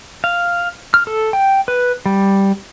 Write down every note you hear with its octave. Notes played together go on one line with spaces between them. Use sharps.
F5
F6
A4
G5
B4
G3